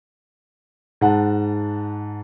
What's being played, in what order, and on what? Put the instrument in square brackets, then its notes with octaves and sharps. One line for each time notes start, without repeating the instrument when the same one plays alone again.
[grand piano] G#2 F#5 A5